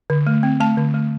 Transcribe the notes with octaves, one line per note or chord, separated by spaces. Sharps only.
D3
A3
C4
A3 A5
D3
A3